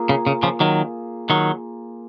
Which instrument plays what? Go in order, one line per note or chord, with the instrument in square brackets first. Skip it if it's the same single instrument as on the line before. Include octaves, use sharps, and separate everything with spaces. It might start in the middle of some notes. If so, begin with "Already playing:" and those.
Already playing: [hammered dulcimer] A#3 F4 G#4
[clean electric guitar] C#3
C#3
C#3 F3
D#3 F#3
D#3 F#3